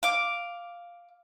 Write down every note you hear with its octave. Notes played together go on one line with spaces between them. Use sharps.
F5 D6